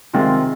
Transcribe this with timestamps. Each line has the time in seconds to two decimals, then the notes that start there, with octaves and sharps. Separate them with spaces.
0.14 C3 D#3 G#3 C4 F4